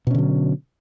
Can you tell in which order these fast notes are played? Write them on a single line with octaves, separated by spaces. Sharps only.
B2 C#4 D3 F#3